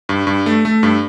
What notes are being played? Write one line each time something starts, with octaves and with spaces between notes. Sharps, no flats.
G2
G2
A3
A3
G2